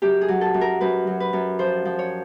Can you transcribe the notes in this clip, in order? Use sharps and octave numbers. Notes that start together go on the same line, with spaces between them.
F#2 G4
G#4
F#3
A4
F#2
A#4
F#2 B4
F#3
B4
F#2
F3 C5
F3
C#5